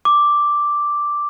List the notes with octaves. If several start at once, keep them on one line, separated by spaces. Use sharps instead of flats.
D6